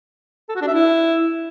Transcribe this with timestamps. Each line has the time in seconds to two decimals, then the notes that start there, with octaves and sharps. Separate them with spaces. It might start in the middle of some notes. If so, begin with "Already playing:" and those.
0.49 A4
0.55 F#4
0.61 D4
0.68 E5
0.74 E4